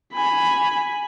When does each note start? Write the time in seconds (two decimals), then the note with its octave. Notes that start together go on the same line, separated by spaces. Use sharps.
0.13 G#5 B5